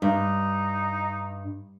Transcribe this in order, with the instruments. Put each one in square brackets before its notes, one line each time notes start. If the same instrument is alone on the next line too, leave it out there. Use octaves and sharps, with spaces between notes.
[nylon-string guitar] G2 [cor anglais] D#4